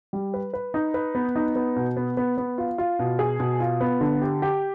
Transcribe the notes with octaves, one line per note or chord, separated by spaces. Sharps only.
G3
B4
B4
D#4
B4
B3
D#4
B3
B2
B3
B3
B3
F4
F4
B2
G#4
B2
F4
B3
D3
G4
G4